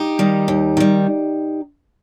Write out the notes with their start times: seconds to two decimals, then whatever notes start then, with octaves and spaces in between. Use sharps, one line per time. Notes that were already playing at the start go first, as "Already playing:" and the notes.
Already playing: D#4 G4
0.19 D#3 G3
0.48 D#2
0.77 D#3 G3